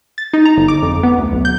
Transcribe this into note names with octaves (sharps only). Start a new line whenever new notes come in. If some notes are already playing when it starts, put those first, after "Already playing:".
A6
D#4
A#5
G1
D6
F2
B3
D2
B1
G6